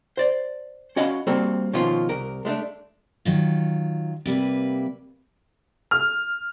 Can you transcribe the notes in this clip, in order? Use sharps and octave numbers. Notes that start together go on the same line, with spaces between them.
C5 D5
C#4 F#4 D#5 F5 B5
G3 A#3 C4 F#4 A4
B2 D#3 F3 C#4 F4
C2 A#4
G#3 A3 B3 D4
D#3 F#3 F4
C3 G3 A#3 B4
F6